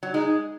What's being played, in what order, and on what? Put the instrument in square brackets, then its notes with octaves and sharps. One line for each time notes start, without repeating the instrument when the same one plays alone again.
[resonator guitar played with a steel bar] F#3
[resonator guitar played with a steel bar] G#3 [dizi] D#4